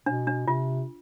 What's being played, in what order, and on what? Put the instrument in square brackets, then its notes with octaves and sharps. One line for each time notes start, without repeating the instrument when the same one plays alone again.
[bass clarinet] B2 [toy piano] D4
[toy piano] D4
[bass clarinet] C3 [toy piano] F4